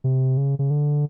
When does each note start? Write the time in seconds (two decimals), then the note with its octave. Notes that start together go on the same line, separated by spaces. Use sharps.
0.04 C3
0.37 C#3
0.59 C#3
0.70 D3